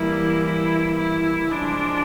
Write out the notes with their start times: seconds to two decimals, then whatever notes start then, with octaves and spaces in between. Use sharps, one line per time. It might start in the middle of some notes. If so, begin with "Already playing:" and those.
Already playing: E3 G3 A#3 E4
0.45 E4
0.98 E4
1.51 C#3 F3 G#3 D4